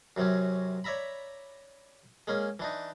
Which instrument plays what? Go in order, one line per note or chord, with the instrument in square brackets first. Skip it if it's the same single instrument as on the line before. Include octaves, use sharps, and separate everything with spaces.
[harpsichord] F#2 C3 F#3 C#4
C#5 D5 E5 A#5 B5
G#3 A#3 C#4
E3 D4 D#4